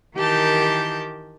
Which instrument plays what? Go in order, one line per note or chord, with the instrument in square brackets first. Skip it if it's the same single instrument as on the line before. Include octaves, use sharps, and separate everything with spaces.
[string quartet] D#3 E3 G4 A#4 A5 G6